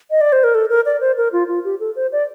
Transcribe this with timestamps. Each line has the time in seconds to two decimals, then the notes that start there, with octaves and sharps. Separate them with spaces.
0.11 D#5
0.21 D5
0.33 C5
0.44 A#4
0.55 A4
0.70 A#4
0.86 D5
1.01 C5
1.17 A#4
1.33 F4
1.48 F4
1.64 G4
1.80 A4
1.96 C5
2.12 D5